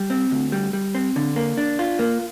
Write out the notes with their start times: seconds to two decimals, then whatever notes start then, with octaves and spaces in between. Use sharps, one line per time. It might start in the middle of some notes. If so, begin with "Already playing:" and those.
Already playing: G3
0.10 C4
0.31 D2
0.52 G3
0.73 G3
0.95 C4
1.16 D3
1.36 A#3
1.57 D4
1.79 F4
1.99 A#3